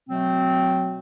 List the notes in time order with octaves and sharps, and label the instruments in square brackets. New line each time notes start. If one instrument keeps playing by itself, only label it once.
[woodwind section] B2 F#3 A3 C4